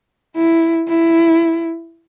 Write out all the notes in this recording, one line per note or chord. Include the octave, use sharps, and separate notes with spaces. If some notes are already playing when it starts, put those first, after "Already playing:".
E4
E4